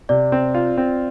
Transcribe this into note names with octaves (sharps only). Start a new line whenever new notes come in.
C3 D5
C4
F4
C4